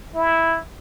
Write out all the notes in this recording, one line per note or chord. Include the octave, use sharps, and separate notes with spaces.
E4